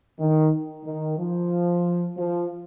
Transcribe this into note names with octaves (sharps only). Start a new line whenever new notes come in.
D#3
D#3
F3
F3